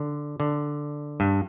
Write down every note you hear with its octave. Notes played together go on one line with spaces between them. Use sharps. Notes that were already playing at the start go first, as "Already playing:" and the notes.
Already playing: D3
D3
G2